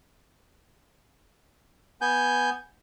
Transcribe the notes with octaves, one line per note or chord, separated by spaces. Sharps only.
B3 G#5 G6